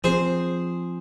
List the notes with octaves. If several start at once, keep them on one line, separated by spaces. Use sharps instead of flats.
F3 C4 G#4 C5